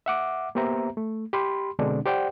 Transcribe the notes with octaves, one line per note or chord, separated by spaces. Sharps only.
E5 F#5 D6
A#3 B3 G4 C5 E5 A#5
A3
G4 B5 C6
B2 D3 G#3 C4 D4
G4 C5 D5 F#5 G5